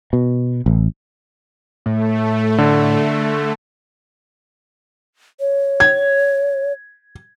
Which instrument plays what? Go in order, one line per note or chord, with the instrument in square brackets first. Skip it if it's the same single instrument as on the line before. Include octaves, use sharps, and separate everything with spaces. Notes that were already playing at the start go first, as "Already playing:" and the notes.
[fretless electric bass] B2
A1
[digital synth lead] A2 [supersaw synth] A3
[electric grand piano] D3
[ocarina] C#5
[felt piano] G#6